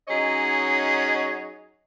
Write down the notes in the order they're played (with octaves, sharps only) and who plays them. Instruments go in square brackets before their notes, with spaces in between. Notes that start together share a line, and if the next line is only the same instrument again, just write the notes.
[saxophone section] F#3 C#4 D#4 G#4 C#5 D#5